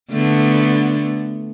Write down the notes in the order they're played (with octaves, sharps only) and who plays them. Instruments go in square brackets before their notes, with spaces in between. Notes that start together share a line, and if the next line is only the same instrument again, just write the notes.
[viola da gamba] D3 A3 B3